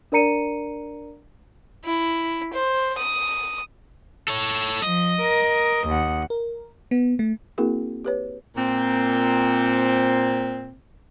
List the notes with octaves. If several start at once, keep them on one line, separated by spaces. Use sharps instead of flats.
D4 A#4 D5 A#5 C#7 D#7
E4
C5
D#6
A4 C#5
F3 D#5
A#4
D#2 F#5
A#4
B3
A3
A#3 C4 E4 F#4 G#4 A#4
G4 B4 C#5
A#2 C4